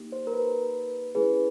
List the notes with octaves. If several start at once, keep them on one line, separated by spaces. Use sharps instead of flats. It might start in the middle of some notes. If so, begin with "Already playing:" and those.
Already playing: A#3 D#4 G4
C5
A#4
B4
A3 C#4 E4 G#4 B4